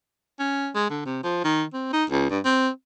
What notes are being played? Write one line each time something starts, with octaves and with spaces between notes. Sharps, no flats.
C#4
G#3
D3
C3
F3
D#3
C4
D#4
C#2
G2
C4